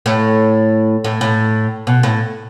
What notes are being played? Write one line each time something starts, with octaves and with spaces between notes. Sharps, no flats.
A2
A2
A2
B2
A2